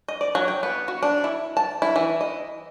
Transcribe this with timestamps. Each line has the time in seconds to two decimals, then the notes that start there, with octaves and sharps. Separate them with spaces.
0.08 D#5
0.21 D5
0.35 F#3
0.48 G5
0.63 B3
0.88 F#4
1.03 D4
1.24 E4
1.57 A5
1.82 E4
1.96 E3
2.21 D#5